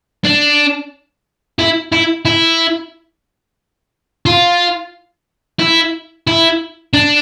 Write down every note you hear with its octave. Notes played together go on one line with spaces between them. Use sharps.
D4
E4
E4
E4
F4
E4
E4
D4